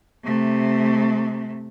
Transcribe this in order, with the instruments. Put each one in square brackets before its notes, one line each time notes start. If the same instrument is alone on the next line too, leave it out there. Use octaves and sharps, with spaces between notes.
[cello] C3 A3